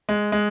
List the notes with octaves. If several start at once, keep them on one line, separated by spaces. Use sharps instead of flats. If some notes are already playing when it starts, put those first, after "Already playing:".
G#3
G#3